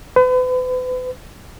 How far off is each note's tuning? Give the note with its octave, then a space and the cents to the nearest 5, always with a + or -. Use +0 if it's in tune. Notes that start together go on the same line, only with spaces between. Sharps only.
B4 +40